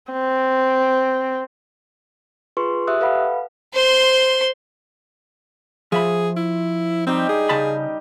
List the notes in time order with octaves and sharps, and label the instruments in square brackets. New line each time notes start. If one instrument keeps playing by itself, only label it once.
[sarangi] C4
[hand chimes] F4 G#4 B4 C6 C#6
G4 E5 D#6 E6 F#6
A4 B4 F5 F#5 B5
[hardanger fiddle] C5 C6
[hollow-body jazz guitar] F3 E5 B5 [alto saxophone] G#4
[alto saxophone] E4
[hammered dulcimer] G3 D#4 G4 [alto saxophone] C4
[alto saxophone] G#4
[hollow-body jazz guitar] C#3 A5 B5